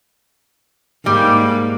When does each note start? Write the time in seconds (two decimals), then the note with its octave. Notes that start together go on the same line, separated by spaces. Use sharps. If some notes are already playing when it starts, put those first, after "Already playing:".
1.06 G#2 G3 A#3